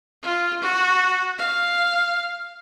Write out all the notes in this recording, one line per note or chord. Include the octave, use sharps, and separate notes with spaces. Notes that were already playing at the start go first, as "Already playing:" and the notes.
F4
F#4
F5